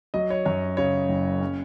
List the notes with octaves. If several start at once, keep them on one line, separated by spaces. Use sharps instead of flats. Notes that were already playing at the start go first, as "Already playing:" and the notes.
F#3 D#5
C#5
F#2 C#5
C#3 C#5
F#1
C#4